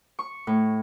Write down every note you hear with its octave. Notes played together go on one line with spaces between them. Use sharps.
C#6
A2